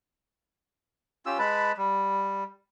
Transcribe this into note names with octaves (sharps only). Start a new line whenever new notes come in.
C#4 F4 G4 E6
G#3 B4 A5 B5
G3